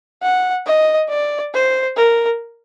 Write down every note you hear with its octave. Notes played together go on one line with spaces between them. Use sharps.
F#5
D#5
D5
C5
A#4